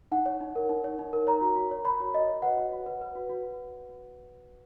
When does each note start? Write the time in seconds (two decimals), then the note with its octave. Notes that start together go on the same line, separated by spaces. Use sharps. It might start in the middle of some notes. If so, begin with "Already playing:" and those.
0.12 D#4 F#5
0.26 C#5
0.41 D#4
0.56 A#4
0.69 D#4
0.84 C#5
0.99 D#4
1.13 A#4
1.27 C#5 A#5
1.41 F#4
1.56 F#4
1.71 C#5
1.85 C#5 B5
2.00 F#4
2.14 F#4 D#5
2.29 C#5
2.42 B4 F#5
2.57 F#4
2.72 F#4
2.86 B4
3.01 B4
3.15 F#4
3.30 F#4